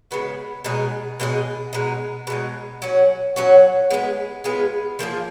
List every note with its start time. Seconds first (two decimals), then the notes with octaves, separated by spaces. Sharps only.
0.11 C#3 G#3 B3 F#4
0.64 B2 G#3 D#4 G#4
1.20 B2 G#3 D#4 G#4
1.73 B2 G#3 D#4
2.27 B2 G#3 D#4
2.82 F#3 C#4 F#4
3.36 F#3 C#4 F#4
3.91 G#3 B3 F4 G#4
4.44 G#3 B3 F4 G#4
4.99 F3 A#3 F4 G#4